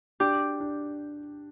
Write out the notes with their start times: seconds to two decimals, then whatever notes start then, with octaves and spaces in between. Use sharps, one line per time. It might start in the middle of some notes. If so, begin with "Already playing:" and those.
0.20 D4 G4
0.60 D4